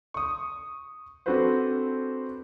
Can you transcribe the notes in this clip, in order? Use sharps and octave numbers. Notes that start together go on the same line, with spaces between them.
C#6 D#6
C4 D4 F#4 A4 B4 C5